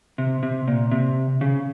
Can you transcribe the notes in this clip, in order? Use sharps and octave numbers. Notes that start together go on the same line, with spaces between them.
C3
C3
A#2
C3
C#3